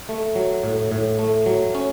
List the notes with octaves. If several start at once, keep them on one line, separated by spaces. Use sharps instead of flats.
A3
F#3
A2
A2
A3
F#3
C#4